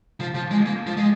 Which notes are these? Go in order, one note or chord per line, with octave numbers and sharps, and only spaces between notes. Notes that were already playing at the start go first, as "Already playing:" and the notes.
F3
F3
G#3
A#3
F3
G#3